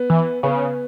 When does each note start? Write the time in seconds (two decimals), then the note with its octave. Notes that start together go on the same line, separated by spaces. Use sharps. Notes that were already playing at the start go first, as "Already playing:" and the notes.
Already playing: B3
0.10 E3
0.43 C#3 B3